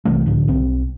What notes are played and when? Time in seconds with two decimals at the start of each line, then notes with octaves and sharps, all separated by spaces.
0.05 B1 C3 E3 A3
0.26 C#2 A2 D3 F3
0.48 B1 C4